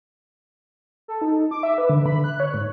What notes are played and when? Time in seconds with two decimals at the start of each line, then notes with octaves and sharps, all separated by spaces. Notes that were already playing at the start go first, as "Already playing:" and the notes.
1.08 A4
1.22 D#4
1.51 D6
1.63 E5
1.78 B4
1.90 D3
2.06 B5
2.24 F#6
2.40 C#5
2.54 G#2